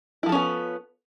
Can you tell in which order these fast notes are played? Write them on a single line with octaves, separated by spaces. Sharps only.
E4 F3 A4 C#4 B3